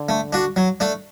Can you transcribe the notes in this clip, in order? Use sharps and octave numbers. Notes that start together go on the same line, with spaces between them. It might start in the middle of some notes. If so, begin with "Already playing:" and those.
Already playing: D3
A3
D4 F#4
F#3
A3 D4